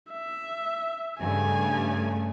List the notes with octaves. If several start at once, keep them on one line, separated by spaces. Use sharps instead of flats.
E5
G2 C#3 A3 G#5